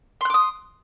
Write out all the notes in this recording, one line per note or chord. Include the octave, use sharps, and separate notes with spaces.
C6 D6 D#6 F#6